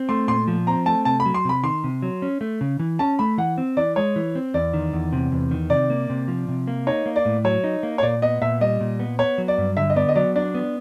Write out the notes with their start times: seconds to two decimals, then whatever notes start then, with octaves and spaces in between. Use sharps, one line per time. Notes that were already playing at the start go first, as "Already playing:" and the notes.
Already playing: C4
0.09 A3 C6
0.28 A#2 C6
0.48 F3
0.67 C4 A#5
0.86 A3 A5
1.05 C3 A5
1.20 B5
1.26 F#3
1.34 C6
1.45 C3 B5
1.63 D#3 C6
1.84 C3
2.02 F#3
2.22 C#4
2.41 A3
2.61 C#3
2.79 E3
2.99 C#4 A5
3.19 A3 B5
3.38 E3 F#5
3.58 C4
3.77 E3 D5
3.96 G#3 C#5
4.16 E3
4.35 C4
4.54 E2 D5
4.74 D#3
4.93 E2
5.13 C3
5.32 E2
5.51 D#3
5.70 C3 D5
5.90 A#3
6.10 C3
6.28 F3
6.48 C3
6.67 A#3
6.87 D#4 C#5
7.06 A#3
7.16 D5
7.25 A2
7.44 F#3 C#5
7.64 D#4
7.83 A#3
7.98 C#5
8.02 A#2 D5
8.22 B3 D#5
8.42 A#2 E5
8.61 G3 D#5
8.81 A#2
9.00 B3
9.19 B3 C#5
9.38 F#3
9.48 D5
9.58 G2
9.77 D3 E5
9.90 D#5
9.96 B3 D5
10.09 D#5
10.16 F#3 D5
10.36 D4 D5
10.54 B3